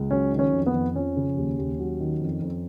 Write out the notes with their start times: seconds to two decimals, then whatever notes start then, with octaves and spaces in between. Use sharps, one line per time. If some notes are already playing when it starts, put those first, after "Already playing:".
Already playing: C#2
0.11 F#3 C#4
0.32 D#3
0.39 C#4
0.53 F2
0.66 B3
0.74 F2
0.95 F3 C#4
1.17 C#3
1.36 D#2
1.59 D#2
1.79 F#3
2.00 D#3
2.21 F2
2.42 F2